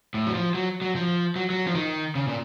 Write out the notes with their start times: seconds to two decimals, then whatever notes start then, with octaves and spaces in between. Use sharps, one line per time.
0.14 A2
0.27 F#3
0.34 F3
0.54 F#3
0.82 F#3
0.96 F3
1.36 F#3
1.50 F#3
1.67 F3
1.75 D#3
2.15 C#3
2.28 A#2